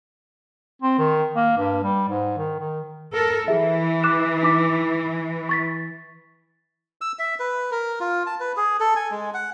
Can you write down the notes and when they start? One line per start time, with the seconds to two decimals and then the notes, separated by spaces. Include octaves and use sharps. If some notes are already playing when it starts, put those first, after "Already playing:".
0.82 C4
0.98 D#3
1.36 A#3
1.58 G2
1.83 G3
2.09 G#2
2.38 D#3
2.59 D#3
3.13 A4 A#4
3.48 E3 G#4 E5
4.04 D6 F#6 E7
4.43 D#4 D6 B6
5.49 C#6 A6 B6
7.01 E6
7.19 E5
7.39 B4
7.71 A#4
8.00 F4
8.26 A5
8.40 B4
8.57 G#4
8.80 A4
8.96 G#5
9.11 G#3
9.34 F#5